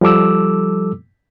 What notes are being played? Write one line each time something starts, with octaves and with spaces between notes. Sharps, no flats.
F3 G3 A4 D6 E6